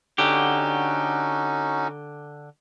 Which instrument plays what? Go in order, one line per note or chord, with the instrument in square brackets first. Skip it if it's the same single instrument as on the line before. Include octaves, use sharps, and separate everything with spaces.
[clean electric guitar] D3 G4 [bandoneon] C#4 D#4 F#4